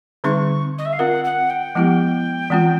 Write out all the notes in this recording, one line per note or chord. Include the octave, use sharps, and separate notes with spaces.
D3 G3 C4 D#4 G#4 C#6
D#5
E5
F5
C4 F4 A#4 F#5
F#5
G5
F3 G#3 B3 E4 G4
E3 G#3 C4 F4